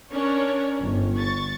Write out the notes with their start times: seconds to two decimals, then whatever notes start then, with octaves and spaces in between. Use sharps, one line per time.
0.13 C#4 D4 A#4 C#5 D5
0.79 G1
1.18 C#6 A6